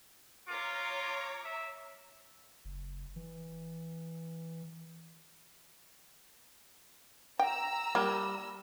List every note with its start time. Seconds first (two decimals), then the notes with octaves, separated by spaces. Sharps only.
0.48 F4 C#5 A#5 D6
1.44 E5
2.65 F#1
3.16 E3
7.39 G5 A#5 E6
7.95 G3 A#3